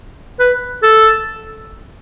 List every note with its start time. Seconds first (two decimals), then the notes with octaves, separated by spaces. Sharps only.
0.40 B4
0.83 A4